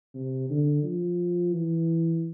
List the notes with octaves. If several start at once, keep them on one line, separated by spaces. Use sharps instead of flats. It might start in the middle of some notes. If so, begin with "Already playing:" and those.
C3
D3
F3
E3